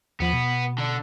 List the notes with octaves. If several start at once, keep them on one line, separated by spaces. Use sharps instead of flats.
D#2 F3 B3
B2
D3